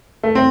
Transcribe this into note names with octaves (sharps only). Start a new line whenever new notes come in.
A3
C4